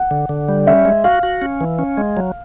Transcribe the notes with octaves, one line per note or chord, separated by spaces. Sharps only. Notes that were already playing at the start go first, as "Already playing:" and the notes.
Already playing: F#5
D3
D3
G3
C#4 E5
G#3
F#4 F5
F#4
C#4
E3
C#4
G#3
F#3